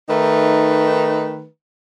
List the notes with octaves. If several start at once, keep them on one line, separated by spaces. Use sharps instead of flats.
D#3 A3 D#4 B4